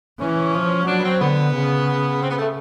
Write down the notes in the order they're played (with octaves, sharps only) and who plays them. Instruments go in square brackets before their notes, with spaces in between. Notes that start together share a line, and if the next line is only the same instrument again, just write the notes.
[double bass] E3 [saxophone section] C#4
[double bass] F3
[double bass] F#3 [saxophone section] D4
[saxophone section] B3
C4
[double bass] D3 [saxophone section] B3
[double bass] C#3
[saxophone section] C4
B3
A3